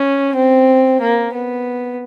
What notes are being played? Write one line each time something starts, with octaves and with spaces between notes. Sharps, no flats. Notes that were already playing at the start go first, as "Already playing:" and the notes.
Already playing: C#4
C4
A#3
B3